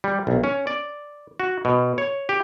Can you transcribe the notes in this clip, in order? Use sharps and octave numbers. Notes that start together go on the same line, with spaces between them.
G3
B1
C#4
D5
F#4
B2
C#5
G4